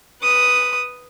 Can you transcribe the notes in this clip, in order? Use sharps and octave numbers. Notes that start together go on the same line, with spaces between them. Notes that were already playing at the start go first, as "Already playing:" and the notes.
B4 D#6